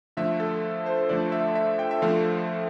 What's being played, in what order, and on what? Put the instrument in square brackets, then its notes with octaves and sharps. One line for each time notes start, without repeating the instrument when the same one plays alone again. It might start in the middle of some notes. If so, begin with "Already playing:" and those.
[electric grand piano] D3 F3 A3 E5
A4
C5
D3 F3 A3 D5
E5
E5
G5
E5
D3 F3 A3 F5